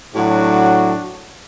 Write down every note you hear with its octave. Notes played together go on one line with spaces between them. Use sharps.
A2 F#3 D4 F#4